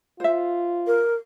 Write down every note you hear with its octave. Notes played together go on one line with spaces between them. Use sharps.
F4 C5 E5
A#4